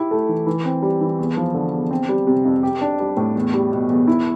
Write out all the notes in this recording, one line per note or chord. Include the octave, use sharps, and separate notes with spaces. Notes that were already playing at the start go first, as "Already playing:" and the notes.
Already playing: E4 G4
A3
E3
E3
C4
G3
E3
E2
F3
D3
E2
C4
G3
C3
F2
G4
D4
G3
A2
E2
G3
B2
E2
E4